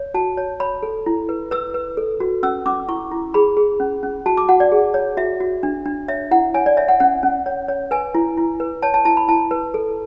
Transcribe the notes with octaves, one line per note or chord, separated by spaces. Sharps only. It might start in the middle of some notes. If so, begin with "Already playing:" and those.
Already playing: C#5
F#4 A5
C#5
C#5 B5
A4
E4
B4
B4 E6
B4
A4
F#4
C#4 E6
C#4 D6
E4 C#6
E4
G#4 B5
G#4
C#4
C#4
F#4 A5
D6
F#4 F#5
D5
G#4
C#5
F#4 E5
F#4
D4
D4
C#5 E5
E4 F#5
C#5 G#5
D5
C#5 E5
F#5
C#4 F#5
C#4
C#5
C#5
B4 G#5
E4
E4
B4
C#5 A5
A5
E4 A5
B5
E4 A5
B4
A4